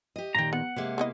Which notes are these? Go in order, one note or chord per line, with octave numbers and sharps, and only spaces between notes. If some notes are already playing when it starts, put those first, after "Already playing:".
G4 D#5
A#2 D#3 G5 A#5
B3 F#5
C3 G#3 A#3
B3 E4 D#5